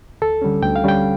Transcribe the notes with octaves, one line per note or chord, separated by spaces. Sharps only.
D2 A4
D3 G3 C#4
D2 G5
F5
D3 G3 C#4 G5